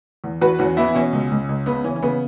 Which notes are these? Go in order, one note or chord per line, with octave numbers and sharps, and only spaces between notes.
E2
E2 F#4 B4
E2 C#4 F#4
E3 B3 E4
B2 C#4
C#2
C#2
C#2
C#3 B3
E3 C#4
C#4
C#3 B3